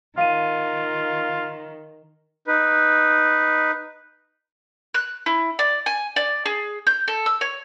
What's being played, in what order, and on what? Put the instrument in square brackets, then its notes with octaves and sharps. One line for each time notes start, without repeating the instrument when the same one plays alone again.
[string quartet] D#3 [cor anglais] F4 [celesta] F5 D#7
[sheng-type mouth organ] D#4 B4
[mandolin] F#6
E4
D5
G#5
D5
G#4
G6
A4
E6
C#5